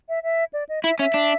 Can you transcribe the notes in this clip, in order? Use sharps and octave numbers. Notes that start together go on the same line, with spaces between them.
E5
E5
D5
D#5
E4 E5
C#4 E5
D4